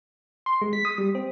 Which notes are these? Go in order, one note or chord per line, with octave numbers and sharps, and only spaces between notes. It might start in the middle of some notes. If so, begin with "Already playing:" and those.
C6
G#3
B6
D#6
G3
C4